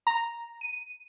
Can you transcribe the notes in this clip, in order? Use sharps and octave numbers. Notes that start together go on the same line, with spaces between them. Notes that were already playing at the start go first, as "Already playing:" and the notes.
A#5
D#7